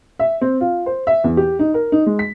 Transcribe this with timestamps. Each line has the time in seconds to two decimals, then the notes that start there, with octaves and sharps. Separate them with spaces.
0.19 E5
0.41 C4
0.61 F4
0.86 C5
1.07 E5
1.24 E2
1.37 G4
1.59 D#4
1.74 A#4
1.92 D#4
2.06 G#3
2.19 B6